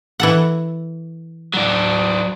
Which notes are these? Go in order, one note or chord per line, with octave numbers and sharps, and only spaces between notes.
E3 A4 F#5
F#3 D4